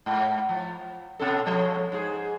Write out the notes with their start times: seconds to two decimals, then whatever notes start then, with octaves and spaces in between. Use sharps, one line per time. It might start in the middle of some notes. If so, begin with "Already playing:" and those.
0.06 G#2
0.49 F3
1.20 B2 C#4 A4
1.46 F3 G#3 C#5
1.92 G#2 G#4